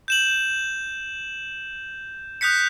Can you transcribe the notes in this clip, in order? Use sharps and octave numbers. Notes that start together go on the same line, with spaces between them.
G6 E7 F#7
D#6 F#6 G6 B6 C#7